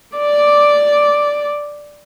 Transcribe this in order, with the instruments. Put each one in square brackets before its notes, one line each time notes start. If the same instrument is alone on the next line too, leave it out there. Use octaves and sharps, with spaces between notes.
[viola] D5 D6